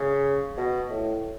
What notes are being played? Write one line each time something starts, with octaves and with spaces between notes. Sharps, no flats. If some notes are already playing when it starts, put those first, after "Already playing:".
Already playing: C#3
B2
A2